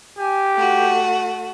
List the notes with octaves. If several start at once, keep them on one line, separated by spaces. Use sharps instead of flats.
G4 G#5
A3 F#4